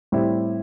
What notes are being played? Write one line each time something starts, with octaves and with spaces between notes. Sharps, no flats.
A2 G3 C4 E4